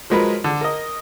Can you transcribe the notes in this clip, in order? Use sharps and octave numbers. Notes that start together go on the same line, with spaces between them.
F3 F#3 G#3 A#4 B4
D3
A#4 D#5